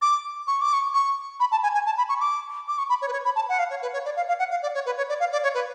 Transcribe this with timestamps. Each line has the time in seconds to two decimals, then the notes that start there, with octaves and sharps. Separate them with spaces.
0.02 D6
0.47 C#6
0.61 D6
0.73 C#6
0.94 C#6
1.40 B5
1.52 A5
1.63 G#5
1.74 G#5
1.86 A5
1.98 B5
2.09 C#6
2.21 D6
2.68 D6
2.78 C#6
2.89 B5
3.02 C#5
3.08 B4
3.13 C#5
3.25 B5
3.36 A5
3.49 F#5
3.59 F5
3.70 C#5
3.82 B4
3.93 C#5
4.05 D5
4.17 F5
4.28 F5
4.39 F#5
4.51 F5
4.62 D5
4.75 C#5
4.86 B4
4.97 C#5
5.09 D5
5.20 F5
5.32 D5
5.43 C#5
5.54 B4